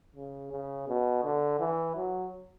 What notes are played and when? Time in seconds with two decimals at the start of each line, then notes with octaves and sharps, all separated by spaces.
0.16 C#3
0.52 C#3
0.88 B2
1.24 D3
1.60 E3
1.96 F#3